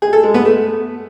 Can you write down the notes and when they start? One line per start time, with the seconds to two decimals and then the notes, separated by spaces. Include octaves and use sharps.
0.02 G#4
0.13 A4
0.24 G#3
0.34 B3
0.45 A3